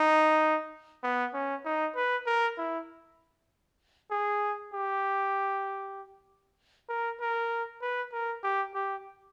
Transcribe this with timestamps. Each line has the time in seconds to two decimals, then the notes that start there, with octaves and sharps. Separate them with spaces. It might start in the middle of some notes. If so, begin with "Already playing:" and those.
Already playing: D#4
1.04 B3
1.34 C#4
1.65 D#4
1.95 B4
2.26 A#4
2.58 E4
4.11 G#4
4.74 G4
6.89 A#4
7.20 A#4
7.81 B4
8.12 A#4
8.43 G4
8.74 G4